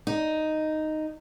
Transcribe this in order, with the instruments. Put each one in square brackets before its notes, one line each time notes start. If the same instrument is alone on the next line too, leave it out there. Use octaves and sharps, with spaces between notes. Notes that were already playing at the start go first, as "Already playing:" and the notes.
[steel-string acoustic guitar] D#4